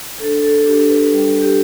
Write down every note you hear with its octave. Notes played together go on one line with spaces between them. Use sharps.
D4 A4
A4
D4 G4
B4
G3
G4